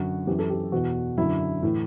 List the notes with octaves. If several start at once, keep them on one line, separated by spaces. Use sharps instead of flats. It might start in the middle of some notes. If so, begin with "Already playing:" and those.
Already playing: F#2 D3 F#4
F#2 E3 G4
A4
G4
E2 B2 F#4
F#2 D3 E4
A2 E3